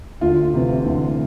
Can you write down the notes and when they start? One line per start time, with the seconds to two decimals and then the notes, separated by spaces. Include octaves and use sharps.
0.21 D2 F4
0.54 C3 E3
0.85 D2